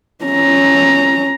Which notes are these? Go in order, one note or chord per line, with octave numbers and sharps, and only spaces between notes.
C#4 A#5